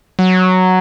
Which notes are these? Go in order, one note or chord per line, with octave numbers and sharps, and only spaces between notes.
F#3